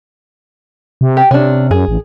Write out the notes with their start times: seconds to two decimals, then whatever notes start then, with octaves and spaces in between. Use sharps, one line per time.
1.01 C3
1.17 G4
1.31 C3 C#4 D4
1.71 F#2 G#4
1.88 A1